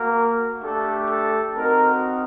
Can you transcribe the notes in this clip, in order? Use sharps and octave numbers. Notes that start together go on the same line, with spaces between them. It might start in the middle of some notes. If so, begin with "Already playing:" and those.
Already playing: A#3 F#4 A#4
A3 D4 G4 A4
A4
C4 D#4 F#4 A#4